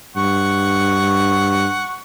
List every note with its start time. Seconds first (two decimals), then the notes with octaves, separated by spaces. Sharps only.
0.16 G2 F#5 C#6